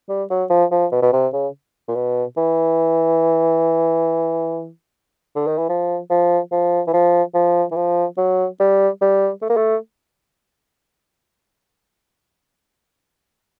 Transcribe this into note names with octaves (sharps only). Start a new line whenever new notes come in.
G3
F#3
F3
F3
B2
B2
C3
C#3
A#2
B2
E3
D3
D#3
E3
F3
F3
F3
E3
F3
F3
E3
F3
F#3
G3
G3
A3
A#3
A3